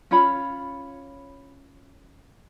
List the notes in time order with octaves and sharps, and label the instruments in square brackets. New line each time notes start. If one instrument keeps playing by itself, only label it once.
[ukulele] C#4 F4 C#5 B5